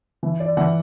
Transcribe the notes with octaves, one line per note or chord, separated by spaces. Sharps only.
E3
D5
E3 F#5